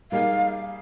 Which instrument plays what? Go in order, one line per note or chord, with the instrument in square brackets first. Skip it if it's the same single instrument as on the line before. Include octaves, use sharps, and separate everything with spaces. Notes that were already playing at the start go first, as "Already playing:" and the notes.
[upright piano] G3 A#3 D#4 G#4 [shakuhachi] F5